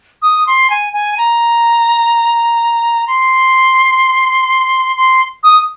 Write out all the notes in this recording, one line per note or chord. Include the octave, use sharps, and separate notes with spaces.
D#6
C6
G#5
G#5
A#5
C6
C6
D#6